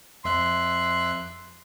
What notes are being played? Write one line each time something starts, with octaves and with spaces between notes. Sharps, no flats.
F2 E5 C6 F#6